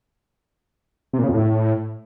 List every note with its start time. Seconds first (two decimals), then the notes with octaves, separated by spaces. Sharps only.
1.13 C3
1.19 A#2
1.24 C#3
1.29 F2
1.34 A2